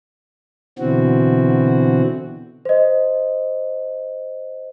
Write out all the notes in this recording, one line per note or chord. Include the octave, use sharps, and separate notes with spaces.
B2 D3 E3 C4 F#4
C5 D#5